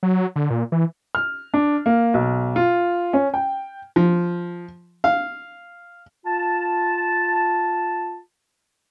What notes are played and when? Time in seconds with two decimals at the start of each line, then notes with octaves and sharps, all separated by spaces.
0.03 F#3
0.36 D3
0.50 A#2
0.72 E3
1.15 F6
1.54 D4
1.86 A#3
2.14 B1
2.56 F4
3.13 C#4
3.34 G5
3.96 F3
5.04 F5
6.26 F4 A5